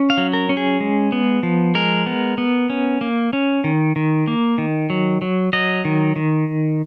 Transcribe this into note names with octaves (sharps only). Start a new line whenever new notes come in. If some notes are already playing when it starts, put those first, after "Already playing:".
Already playing: C#4
F5
F#3
A#4
C#4
G#4
G#3
B3
F3
G#3 A#4
B3
B3
C#4
A#3
C#4
D#3
D#3
A#3
D#3
F#3
F#3
F#3 D#5
D#3
D#3